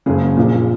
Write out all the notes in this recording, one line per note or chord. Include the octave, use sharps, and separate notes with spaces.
F#1 F#2 C#3 G#4
A#1 A#2